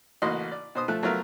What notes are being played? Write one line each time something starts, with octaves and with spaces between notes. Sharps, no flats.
A1 A2 A#3 F#4 D#5 C6
D5
B2 C5 D#6
F3 A3 F#6
F#3 A3 B3 F4 A#4 E5